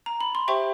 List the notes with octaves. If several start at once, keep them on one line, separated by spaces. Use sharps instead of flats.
A#5
B5
C6
G4 C5 E5 G5 C#6